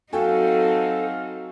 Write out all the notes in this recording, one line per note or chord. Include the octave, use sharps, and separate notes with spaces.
F#3 C4 D#4 F#4 A4 F5 G5 G#5